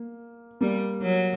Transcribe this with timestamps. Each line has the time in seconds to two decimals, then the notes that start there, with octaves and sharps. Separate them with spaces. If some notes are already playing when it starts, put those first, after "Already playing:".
Already playing: A#3
0.61 G3 A#3
1.02 F#3